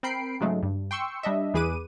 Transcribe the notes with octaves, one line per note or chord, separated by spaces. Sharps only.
C4 A#4 G5 B5 C7 D7
G#2 C#3 F#3 G#3 A3
G2
G5 C6 C#6 E6 C#7
G3 D4 D#5 E5
E2 E3 G#4 B4 D6 D#7